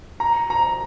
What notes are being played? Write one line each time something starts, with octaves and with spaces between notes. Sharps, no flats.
A#5
A#5